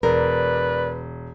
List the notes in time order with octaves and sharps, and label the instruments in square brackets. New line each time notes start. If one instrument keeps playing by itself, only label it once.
[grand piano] E1 [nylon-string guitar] A#4 [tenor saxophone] B4 [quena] D5